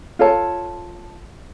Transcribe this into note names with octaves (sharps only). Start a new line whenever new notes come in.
F4 A4 C#5 A5